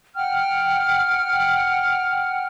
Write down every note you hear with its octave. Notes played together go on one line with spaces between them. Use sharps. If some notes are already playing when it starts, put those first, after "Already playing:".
F#5 G5 F6